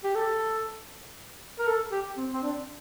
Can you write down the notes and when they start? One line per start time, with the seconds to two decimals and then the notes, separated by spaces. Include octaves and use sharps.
0.04 G4
0.15 A4
1.59 A#4
1.67 A4
1.91 G4
2.17 C4
2.33 C4
2.43 D4